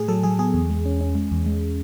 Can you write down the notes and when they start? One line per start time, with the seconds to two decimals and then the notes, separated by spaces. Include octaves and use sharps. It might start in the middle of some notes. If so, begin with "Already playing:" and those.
Already playing: A2 G#4
0.08 F#3 A4
0.23 F#3 G#4
0.39 B3 G#4
0.54 E2
0.70 G#3
0.85 C#4
1.01 C#4
1.15 G#3
1.31 E2
1.46 G#3